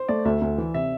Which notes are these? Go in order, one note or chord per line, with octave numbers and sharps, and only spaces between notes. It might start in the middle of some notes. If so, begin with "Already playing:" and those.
Already playing: C5
A3 D5
D2 E5
D2
E3
C3 E5